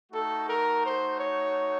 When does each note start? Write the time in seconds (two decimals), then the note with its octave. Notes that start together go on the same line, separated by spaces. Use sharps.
0.12 A3 D#4 F#4 A4
0.48 A#4
0.83 C5
1.19 C#5